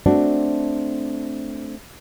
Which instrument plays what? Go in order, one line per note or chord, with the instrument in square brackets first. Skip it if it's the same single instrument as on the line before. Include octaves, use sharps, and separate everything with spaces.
[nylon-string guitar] A3 C4 D4 F#4